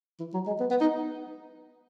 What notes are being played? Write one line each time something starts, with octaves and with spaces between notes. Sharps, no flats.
E3
F#3
G#3
B3
B3
D#4